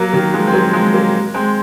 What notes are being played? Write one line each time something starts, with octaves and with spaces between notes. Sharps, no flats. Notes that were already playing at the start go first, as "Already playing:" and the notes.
Already playing: F#3 A#3
D#3 F#3
F3 G#3
C4
F#3 A#3
F3 G#3
F#3 A#3
G#3 C4